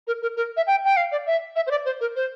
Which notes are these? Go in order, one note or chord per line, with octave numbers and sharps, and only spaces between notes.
A#4
A#4
A#4
E5
G5
G5
F5
D5
E5
E5
C5
D5
C5
A#4
C5